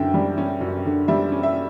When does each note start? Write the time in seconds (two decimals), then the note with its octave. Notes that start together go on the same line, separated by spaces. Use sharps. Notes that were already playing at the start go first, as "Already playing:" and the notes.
Already playing: F#2 D3 C#4 E5 G5
0.14 G3
0.38 C#4
0.61 F#2
0.85 D3
1.08 G3 E5
1.32 C#4
1.43 E5